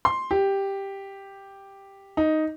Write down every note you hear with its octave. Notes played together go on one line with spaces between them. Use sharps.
C6
G4
D#4